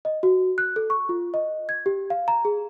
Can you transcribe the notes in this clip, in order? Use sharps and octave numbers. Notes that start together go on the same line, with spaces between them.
D#5
F#4
F#6
A4
C#6
F4
D#5
G#6
G4
F5
A#5
G#4